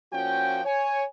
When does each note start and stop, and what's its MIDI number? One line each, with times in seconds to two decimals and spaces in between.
0.13 0.61 46
0.13 0.61 53
0.13 0.61 61
0.13 0.61 66
0.13 0.61 79
0.65 1.04 73
0.65 1.04 80